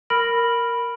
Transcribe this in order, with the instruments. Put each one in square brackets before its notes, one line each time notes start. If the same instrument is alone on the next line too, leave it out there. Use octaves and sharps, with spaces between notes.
[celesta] A#4 B5 F6 A#6 D7 F#7